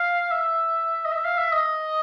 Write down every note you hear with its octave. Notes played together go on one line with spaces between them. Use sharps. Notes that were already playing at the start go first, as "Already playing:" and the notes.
Already playing: F5
E5
D#5
E5
F5
E5
D#5